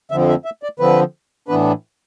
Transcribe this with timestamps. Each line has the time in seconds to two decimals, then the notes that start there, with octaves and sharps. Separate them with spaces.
0.11 F2 D3 F3 C4 E5
0.29 E5
0.45 E5
0.63 D5
0.79 D3 F3 C4 B4
1.48 A2 E3 B3 D4 B4